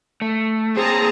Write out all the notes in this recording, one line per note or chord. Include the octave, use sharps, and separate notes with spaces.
A3
A#3 C4 G#4 C5 A5 A#5